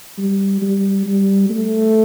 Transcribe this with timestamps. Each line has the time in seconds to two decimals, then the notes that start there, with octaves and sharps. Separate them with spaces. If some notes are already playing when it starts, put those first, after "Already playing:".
0.18 G3
0.62 G3
1.06 G3
1.50 A3